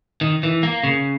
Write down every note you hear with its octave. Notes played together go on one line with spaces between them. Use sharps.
D#3
E3
A#3
C#3